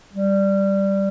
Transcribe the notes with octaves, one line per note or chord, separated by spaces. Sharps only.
G3